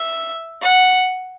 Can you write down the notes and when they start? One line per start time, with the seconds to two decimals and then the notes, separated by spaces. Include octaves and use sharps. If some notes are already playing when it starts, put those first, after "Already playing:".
Already playing: E5
0.62 F#5